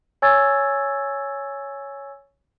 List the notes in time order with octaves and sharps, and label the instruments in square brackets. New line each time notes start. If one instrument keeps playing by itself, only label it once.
[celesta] C#5 G#5 C#6 E6 G#6 A6